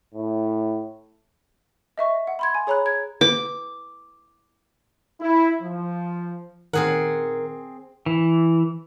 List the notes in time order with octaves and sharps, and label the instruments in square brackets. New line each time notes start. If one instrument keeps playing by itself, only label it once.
[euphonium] A2
[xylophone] D#5 E5 C#6
F#5
B5 C6 G#6
G#5
G#4 C#5 A#5 B5 F#6
G#6
[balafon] B4 [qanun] D6
[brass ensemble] E4
F3
[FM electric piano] A#2 D#3 [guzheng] C4 G#4 F#5 [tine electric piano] A#4
[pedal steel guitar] E3